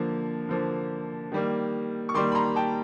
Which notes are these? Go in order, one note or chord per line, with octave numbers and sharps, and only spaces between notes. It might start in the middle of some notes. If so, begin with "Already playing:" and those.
Already playing: D3 F3 A#3
D3 F3 A#3
D#3 G3 A#3
C#6
D#3 G3 A#3 C6 D6
B5
A#5 C6
G5 A5